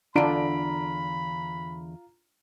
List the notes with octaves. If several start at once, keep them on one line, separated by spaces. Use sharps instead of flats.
E2 D3 D4 F4 A#5 B5 D7